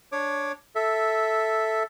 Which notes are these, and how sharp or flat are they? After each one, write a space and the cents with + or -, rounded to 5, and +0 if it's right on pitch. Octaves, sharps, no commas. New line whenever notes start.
D4 -10 C#5 +0 D6 +5
A4 +0 E5 -5